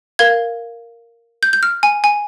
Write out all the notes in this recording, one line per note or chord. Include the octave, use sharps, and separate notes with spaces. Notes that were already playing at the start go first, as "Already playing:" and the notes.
A#4 F5 G#6
G6
G6
F6
G#5
G#5